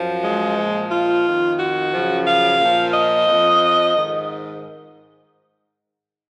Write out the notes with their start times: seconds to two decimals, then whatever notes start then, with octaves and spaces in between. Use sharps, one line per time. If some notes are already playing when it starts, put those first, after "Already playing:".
Already playing: F#2 F3
0.23 G#3
0.57 A#2 F3
0.91 F4
1.24 F2 D#3
1.58 F#4
1.92 F#2 C#3 F3
2.26 F5
2.59 A#2 F3
2.93 D#5
3.27 F2 F3
3.95 G#2 D#3